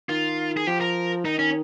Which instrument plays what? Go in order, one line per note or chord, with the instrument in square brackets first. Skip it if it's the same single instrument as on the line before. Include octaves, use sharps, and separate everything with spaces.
[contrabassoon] D#3 [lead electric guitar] F4
[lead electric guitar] G#4
[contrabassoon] F3 [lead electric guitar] G4
[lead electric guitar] A#4
[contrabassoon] D#3 [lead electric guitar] D#4
[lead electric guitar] C#4